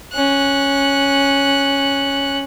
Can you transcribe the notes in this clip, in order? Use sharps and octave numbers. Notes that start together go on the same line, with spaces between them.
C#4 F#6